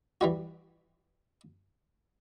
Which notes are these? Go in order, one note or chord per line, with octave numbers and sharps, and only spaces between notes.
E3 G3 F#4